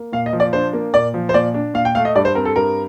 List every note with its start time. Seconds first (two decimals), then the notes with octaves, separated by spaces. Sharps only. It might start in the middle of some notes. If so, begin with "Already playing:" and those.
Already playing: A#3
0.13 A#2 F5
0.26 D#5
0.33 F3
0.40 D5
0.53 D4 C5
0.73 A#3
0.94 A#2 D5
1.14 F3
1.29 C5
1.34 A#2 D5
1.54 D4
1.74 A#2 F5
1.85 G5
1.95 A3 F5
2.05 D#5
2.15 G2 D5
2.25 C5
2.35 C4 A#4
2.45 A4
2.56 G2 A#4